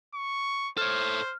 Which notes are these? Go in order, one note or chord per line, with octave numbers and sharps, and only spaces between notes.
C#6
A4 C5 C#5 F6